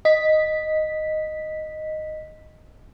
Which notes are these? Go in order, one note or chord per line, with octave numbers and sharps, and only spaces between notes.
D#5 B6